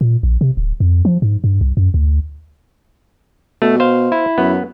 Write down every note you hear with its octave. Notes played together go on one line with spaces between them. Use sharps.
A#2
A#1
C3
D1
F2
F3
G#2
G2
C2
F#2
D2
B2 A3
C5 F5
E4
F#2 B3